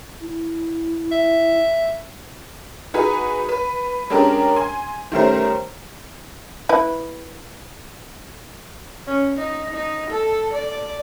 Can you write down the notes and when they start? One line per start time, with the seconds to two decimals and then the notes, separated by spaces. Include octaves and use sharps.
0.21 E4
1.12 E5
2.94 D#4 F#4 G#4 B4
3.49 B4
4.10 G#3 C#4 D4 G4 A#4
4.56 G#5 C6
5.12 D#3 G3 A3 C#4 A#4 C5
6.69 E4 B4
9.06 C#4
9.37 D#4
9.74 D#4
10.10 A4
10.53 D5